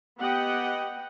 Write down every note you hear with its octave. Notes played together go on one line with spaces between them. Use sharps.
B3 G4 D#5 F#5 G5